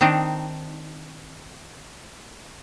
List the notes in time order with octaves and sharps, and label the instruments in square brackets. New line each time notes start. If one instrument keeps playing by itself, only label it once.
[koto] D#3 C4 D4 D#4